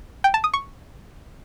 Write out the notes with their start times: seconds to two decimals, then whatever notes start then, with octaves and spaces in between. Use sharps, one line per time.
0.24 G5
0.34 A5
0.44 D#6
0.54 C#6